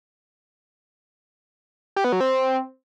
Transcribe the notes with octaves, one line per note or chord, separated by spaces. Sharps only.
G4
B3
F#3
C4